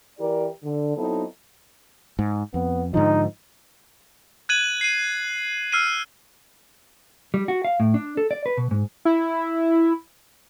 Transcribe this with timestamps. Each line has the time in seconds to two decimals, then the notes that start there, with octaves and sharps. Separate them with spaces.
0.18 E3 E4 G4 A#4 D5
0.63 D3
0.95 F#3 B3 C4 D#4 E4 A4
2.19 G#2
2.54 F2 B3
2.94 G#2 D3 F3 D#4
4.49 F#6 G#6 D#7 F#7
4.81 C7 D#7
5.72 E6 F6 C7 D#7
7.34 G3
7.48 F#4
7.65 F5
7.80 A2
7.94 D4
8.17 A4
8.31 D5
8.46 B4
8.57 B2
8.71 G#2
9.05 E4